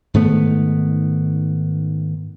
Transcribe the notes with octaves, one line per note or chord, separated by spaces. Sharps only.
G#2 D#3 A3 B3